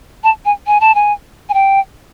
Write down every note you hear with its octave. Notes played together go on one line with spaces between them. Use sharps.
A5
G#5
G#5
A5
G#5
G#5
G5